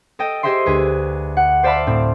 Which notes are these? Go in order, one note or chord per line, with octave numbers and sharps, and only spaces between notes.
A4 D#5 G5
G4 G#4 C5 D#5 E5 C6
D2 G#4 B4
F#5
C5 D5 E5 F5 A5 B5
A2 C4